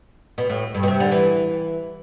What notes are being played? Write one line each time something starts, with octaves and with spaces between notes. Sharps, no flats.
B2
A2
G2
B2
C3
D3
E3